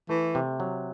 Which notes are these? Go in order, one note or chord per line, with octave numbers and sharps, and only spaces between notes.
E3 A3
C3
F#3